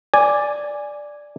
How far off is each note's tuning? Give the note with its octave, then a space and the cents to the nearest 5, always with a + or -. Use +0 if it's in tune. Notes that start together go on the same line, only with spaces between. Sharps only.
D5 +0 G#5 -5